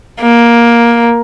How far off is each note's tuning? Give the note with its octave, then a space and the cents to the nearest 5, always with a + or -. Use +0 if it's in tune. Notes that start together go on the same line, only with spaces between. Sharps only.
A#3 +10